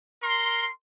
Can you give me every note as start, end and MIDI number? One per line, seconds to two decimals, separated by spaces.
0.22 0.68 70
0.22 0.68 84